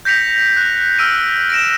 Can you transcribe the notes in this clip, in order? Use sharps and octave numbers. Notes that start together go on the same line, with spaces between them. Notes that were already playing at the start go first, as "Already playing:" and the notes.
G6 A#6 B6 C#7 F7
F#6
E6 F6 D7 D#7
A#6 D7 E7